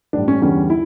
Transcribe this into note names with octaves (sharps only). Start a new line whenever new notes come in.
A1 A2 G3 D4
C#4
E2 D3 G3 C#4
E4